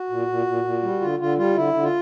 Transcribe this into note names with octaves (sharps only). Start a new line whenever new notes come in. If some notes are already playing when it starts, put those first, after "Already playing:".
Already playing: F#4
A#2
A#2
A#2
A#2
G3
D3 F4
D3 F4
G3 F4
D3 E4
D3
F4